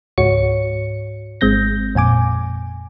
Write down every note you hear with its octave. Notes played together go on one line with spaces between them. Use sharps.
C#2 G#2 F#4 C#5 C#7
G#1 G#3 C4 G6 A#6
F2 A#2 G#5 D6